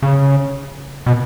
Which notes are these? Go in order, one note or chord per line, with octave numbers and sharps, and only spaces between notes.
C#3
B2